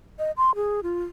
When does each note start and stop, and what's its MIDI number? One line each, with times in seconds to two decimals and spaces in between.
0.19 0.31 75
0.37 0.55 84
0.55 0.80 68
0.83 1.03 65